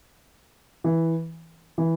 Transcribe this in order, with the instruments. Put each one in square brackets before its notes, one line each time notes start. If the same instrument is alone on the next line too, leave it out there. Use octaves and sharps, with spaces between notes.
[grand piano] E3
E3